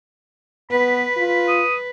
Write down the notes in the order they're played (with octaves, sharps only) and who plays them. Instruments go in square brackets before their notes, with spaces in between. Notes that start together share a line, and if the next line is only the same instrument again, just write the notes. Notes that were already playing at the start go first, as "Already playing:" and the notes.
[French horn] B3 [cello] B4 [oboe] B5
[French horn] F4
[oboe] D#6